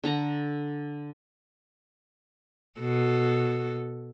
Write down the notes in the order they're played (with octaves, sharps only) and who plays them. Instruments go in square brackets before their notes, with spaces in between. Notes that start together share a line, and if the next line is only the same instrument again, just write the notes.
[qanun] D3 A4 A#5
[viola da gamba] B2 F#4 A4